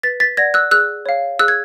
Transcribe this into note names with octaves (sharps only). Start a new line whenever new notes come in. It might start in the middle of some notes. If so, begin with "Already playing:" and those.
B4 A6 B6
A6 B6
D5 F#5 G#6 A#6
E6 F#6
G#4 E6 F#6
C#5 F5
G#4 E6 F#6
G#6